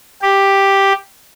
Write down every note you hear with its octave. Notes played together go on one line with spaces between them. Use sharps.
G4